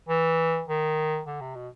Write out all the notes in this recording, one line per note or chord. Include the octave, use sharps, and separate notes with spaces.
E3
D#3
D3
C3
B2